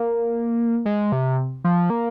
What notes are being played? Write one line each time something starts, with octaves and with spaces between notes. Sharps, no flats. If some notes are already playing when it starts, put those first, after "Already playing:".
Already playing: A#3
G#3
C3
F3
A#3